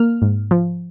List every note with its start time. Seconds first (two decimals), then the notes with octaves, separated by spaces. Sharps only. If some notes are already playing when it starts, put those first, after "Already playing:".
Already playing: A#3 F6
0.22 G#2
0.51 F3